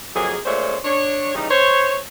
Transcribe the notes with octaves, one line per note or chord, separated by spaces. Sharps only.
F2 D#3 F#3 A#3 G#4
A#2 G#3 A3 C#4 C5 C#5
D4 C#5
C#3 E3 G3 D#4
C5 C#5